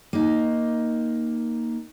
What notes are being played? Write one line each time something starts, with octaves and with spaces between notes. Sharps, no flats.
A#3 D#4